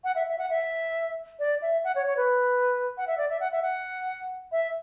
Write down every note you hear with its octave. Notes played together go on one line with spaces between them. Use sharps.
F#5
E5
E5
F#5
E5
D5
E5
F#5
C#5
C#5
B4
F#5
E5
D5
E5
F#5
E5
F#5
E5